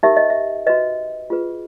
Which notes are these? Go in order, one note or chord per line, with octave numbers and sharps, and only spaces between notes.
D#4 G4 A#4 E5
D#5
E5
F#4 B4 D#5
F4 G#4 B4